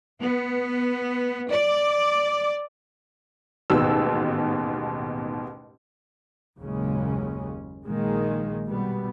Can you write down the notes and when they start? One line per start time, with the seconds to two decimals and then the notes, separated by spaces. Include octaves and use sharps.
0.21 B3
1.51 D5
3.70 A1 D#2 G#2 B2 E6
6.59 F#1 D#2 A#2 C#3 G#3 C#4
7.85 A#1 D#3 G#3 A#3
8.66 B2 G3 B3